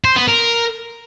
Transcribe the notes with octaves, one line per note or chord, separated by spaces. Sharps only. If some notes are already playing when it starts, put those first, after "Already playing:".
C5
B3
A#4